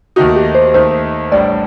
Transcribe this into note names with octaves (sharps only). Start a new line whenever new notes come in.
D#2 D#3 A3 D#4 F#4
G4
C5
D#2 D#3 A3 D#4 C5
A1 A2 G3 D4 D5